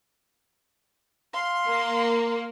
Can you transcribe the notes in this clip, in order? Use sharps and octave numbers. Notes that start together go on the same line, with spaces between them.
F5 C6
A#3